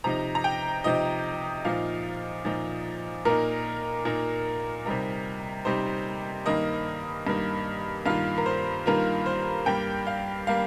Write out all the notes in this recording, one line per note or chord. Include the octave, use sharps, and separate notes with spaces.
C3 F3 D#4 A#5
A#5
G5
C3 F3 D#4 D#5
A#2 F3 D#4 F5
A#2 F3 D#4
A#2 A#3 D#4 A#4
A#2 A#3 D#4
C3 G3 D#4 A#4
C3 G3 D#4 C5
G2 D#3 A#3 D#5
G2 D#3 A#3
G2 D#3 A#3 F4 F5
A#4
C5
G2 D#3 A#3 F4 A#4
C5
G2 G3 A#3 G5
F5
G3 A#3 F5